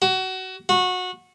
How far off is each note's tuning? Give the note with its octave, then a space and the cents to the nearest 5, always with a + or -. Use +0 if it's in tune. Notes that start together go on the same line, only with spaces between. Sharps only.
F#4 +25
F#4 -20